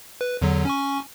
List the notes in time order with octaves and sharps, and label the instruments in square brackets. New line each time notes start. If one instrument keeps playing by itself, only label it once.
[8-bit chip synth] B4
E2 D3 F#3
C#4 G#5 C#6